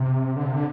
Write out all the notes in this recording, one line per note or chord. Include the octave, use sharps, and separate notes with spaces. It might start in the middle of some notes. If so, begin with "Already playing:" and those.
Already playing: C3
D3
C3
D3